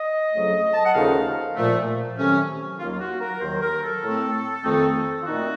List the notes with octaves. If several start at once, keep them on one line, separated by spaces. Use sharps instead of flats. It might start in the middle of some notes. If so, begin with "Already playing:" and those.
Already playing: D#5
F2 C#3 F#3 A3
A5
F#5
D#2 C#3 F3 A3 D#4 F5
A#2 F3 A3
C3 D#3 F#3 A3 C#4
D#2 D#3 F#3 A#3 F4
F4
F#4
A#4
D#2 D#3 F#3 C5
A#4
A4
A2 A3 C4
F2 D#3 A3 C4 D#4
F4
A#2 A3 C4 D#4 F#4